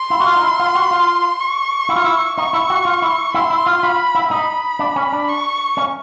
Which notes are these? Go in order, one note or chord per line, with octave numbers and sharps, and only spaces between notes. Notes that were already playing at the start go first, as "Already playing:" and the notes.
Already playing: C6
E4
F#4
F4
D#4
E4
F4
F#4
F4
C#6
E4
F4
E4
D#4 C#6
E4
F#4
F4
E4
E4 C6
E4
F4
F4 B5
E4
D#4 B5
D4
C#4
D4
C#6
C#4